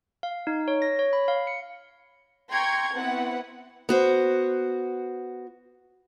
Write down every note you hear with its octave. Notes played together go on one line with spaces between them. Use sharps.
F5
D#4
C#5
A#6
C#5
B5
F5
C#7
G5 A#5 C6 C#6 G#6
B3 C4 E4 F#5
B3 F#4 C5